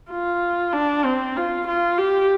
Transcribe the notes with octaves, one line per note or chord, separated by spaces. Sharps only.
F4
D4
C4
F4
F4
G4